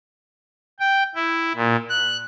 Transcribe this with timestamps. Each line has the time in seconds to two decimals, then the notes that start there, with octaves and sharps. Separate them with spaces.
0.80 G5
1.15 E4
1.55 A#2
1.89 F#6